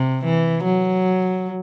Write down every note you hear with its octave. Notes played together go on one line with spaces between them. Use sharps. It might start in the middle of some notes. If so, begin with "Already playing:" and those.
Already playing: C3
E3
F#3